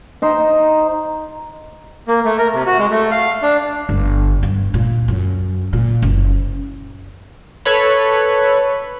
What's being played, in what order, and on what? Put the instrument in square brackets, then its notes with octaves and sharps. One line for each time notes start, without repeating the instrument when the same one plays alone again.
[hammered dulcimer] D#4 C5
[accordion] A#3
A3
A#4
C3
F#4
G#3
A3
F5
D4
[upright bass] G1
G2
A#2
F#2
A#2
F#1
[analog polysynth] A4 B4 C#5 B5